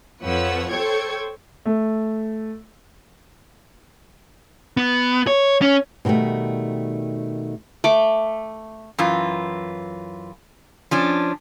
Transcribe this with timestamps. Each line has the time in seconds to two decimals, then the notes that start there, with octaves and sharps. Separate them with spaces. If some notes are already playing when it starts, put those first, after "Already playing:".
0.22 F2 F3 B4 C#5 F#5 E6
0.70 A4 C5 C#5 G5 C#6 G#6
1.65 A3
4.77 B3
5.27 C#5
5.62 C#4
6.05 B2 D#3 F#3 G3 A3
7.84 A3 D6
8.98 F#2 E3 F4
10.91 F3 C#4 D4